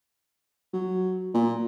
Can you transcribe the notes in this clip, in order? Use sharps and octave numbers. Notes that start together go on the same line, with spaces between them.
F#3
A#2